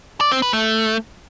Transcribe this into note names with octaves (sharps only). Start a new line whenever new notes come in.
D5
C4
B4
A3